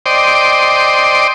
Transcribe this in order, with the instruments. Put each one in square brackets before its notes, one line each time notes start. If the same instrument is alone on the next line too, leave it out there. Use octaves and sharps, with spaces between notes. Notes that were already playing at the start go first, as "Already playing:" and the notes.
[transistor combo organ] C5 D5 D#5 G5